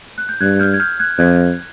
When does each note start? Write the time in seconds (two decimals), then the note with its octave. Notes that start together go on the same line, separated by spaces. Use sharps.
0.18 F#6
0.29 G6
0.40 G2 F#6 G#6
0.60 F6 G6
0.74 G#6
0.80 F6 G6
1.00 F#6 G#6
1.18 F2 F#6 G#6